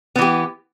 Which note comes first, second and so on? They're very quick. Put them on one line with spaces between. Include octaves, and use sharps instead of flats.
B3 E3 G4